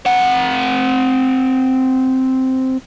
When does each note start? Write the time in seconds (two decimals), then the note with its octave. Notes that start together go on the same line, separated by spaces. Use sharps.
0.06 C4 F#5